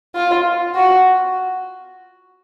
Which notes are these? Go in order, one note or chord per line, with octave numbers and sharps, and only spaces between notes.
F4
F#4